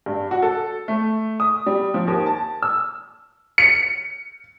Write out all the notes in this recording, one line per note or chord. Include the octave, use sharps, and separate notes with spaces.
G2
F#4
A4
A3
D#6
G3
F3
D#2
A5
E6
C#7